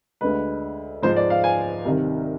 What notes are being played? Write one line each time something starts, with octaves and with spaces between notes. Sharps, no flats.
D2 D3 G#3 B4
G#2 F3 G#3 C5
D5
F5
G#5
C2 C3 D#3